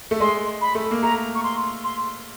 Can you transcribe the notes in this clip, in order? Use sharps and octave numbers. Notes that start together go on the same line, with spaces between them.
A3
G#3 C6
B5
A3
A#3
A3 A#5
C#6
C6
C6